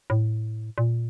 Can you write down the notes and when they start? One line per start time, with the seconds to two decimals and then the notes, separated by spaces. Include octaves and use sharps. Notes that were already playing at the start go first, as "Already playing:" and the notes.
0.10 A2
0.78 A#2